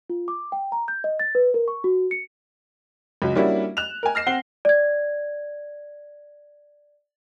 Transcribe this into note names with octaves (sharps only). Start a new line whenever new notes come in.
F4
D6
G5
A#5
G6
D#5
A6
B4
A#4
C#6
F#4
C#7
C#2 F#3
G3 A#3 C#4 D4 E4 F#4
F#6 E7 F7
A#4 G#5
F6 A#6 C7 E7
C4 F#5 G7
D5 G#6